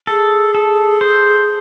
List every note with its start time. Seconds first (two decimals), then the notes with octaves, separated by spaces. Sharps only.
0.07 G#4 A4
0.55 A4
1.01 C5